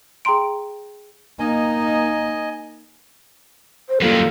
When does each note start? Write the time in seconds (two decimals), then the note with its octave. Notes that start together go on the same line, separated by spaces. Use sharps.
0.25 G#4 G5 A#5 C6 D7
1.39 A#3 D#4 D#5 G#5
3.89 C5
4.02 F#2 D#3 G3 A#3 F4 A4